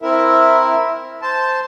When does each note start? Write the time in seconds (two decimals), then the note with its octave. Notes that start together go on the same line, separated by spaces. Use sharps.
0.02 C4 E4 A#4 E5
1.22 C5 A5